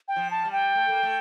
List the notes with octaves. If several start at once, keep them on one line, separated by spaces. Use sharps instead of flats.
G5
F3
A5
G3
G5
A3
A#3
A3